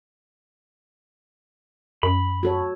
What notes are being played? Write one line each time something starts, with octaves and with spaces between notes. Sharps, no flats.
F#2 B5
F#4 A4 C#5